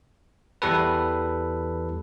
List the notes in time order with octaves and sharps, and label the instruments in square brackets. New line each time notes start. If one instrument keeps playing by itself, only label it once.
[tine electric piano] E2 E3 G3 A4 B4